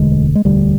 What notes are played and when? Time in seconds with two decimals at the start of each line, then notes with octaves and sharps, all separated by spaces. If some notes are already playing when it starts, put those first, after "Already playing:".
Already playing: E1 D2 D3 G#3
0.35 G#3
0.45 E1 D2 D3 G3